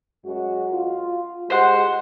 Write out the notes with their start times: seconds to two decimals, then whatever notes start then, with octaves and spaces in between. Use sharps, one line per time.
0.25 F#2 G#3 F#4
0.73 F4
1.50 G#3 F#4 G4 C5 F#5